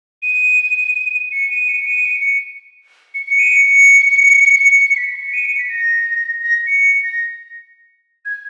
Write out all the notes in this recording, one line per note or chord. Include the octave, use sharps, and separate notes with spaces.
D#7
C#7
D#7
C#7
D#7
C#7
C#7
C#7
C#7
D#7
C#7
C#7
B6
C#7
D#7
C#7
B6
A#6
A#6
C#7
C#7
A#6
G#6